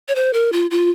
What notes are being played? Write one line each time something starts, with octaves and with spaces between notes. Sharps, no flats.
C#5
C5
A#4
F4
F4